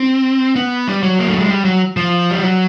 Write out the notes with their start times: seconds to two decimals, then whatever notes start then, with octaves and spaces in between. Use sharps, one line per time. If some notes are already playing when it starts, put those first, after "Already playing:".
Already playing: C4
0.56 B3
0.88 G3
1.03 F#3
1.19 A#3
1.29 A3
1.40 G#3
1.50 G3
1.65 F#3
1.97 F3
2.31 G3
2.43 F#3